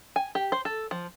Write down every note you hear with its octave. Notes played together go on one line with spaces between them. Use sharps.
G#5
G4
C5
A4
F3